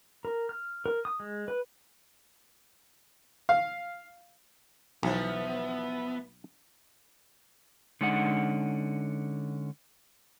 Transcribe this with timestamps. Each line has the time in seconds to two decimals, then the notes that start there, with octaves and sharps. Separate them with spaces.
0.25 A#4
0.49 F6
0.86 A#4
1.05 D#6
1.20 G#3
1.48 B4
3.49 F5
5.03 B1 E3 F3 B3
8.01 D3 G#3 C#4 D#4 F#5